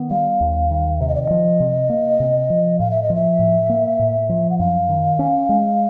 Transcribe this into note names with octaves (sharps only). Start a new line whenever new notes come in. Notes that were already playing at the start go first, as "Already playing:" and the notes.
Already playing: D#3 B3
G3 F5
D#2
D#3
C3 E5
D#5
D5
D#5
F3
C3
A#3
C3
F3
A2 F5
E5
D#5
F3
E5
A2
A#3
A2
F3
F#5
F#2 F5
D#3
C#4
G#3